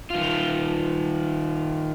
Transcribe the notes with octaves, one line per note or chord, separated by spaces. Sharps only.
D#3 F4